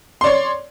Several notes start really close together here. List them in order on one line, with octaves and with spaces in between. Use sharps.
C6 D5 C#5